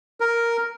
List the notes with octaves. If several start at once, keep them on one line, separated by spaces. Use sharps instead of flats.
A#4